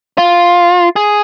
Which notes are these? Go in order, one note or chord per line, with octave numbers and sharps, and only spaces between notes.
F4
G#4